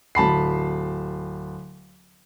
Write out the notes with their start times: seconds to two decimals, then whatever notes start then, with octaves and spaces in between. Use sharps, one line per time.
0.15 D1 A5 B5 C7